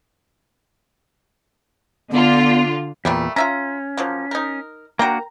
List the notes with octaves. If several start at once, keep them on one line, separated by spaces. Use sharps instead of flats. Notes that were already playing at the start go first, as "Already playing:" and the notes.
D3 B3 F4
E2 A#2 G3 A3 A#3
C#4 F4 E5 A#5
F3 F#3 A#3
D#4 A#4
A#3 D4 F#4 A#4 G5 A#5